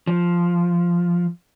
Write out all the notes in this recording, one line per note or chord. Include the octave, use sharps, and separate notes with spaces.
F3